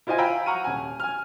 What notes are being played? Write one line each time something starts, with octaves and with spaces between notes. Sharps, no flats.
E4 F4 C5 D#5 G#5
F5 G5 G#5 A#5 B5 E6
F#5 A#5 C#6 F6 D#7
D#1 G#5
G#5 F6